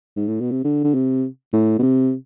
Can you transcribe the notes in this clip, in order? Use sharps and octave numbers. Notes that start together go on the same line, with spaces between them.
G#2
A2
B2
C3
D3
D3
C3
A2
B2
C3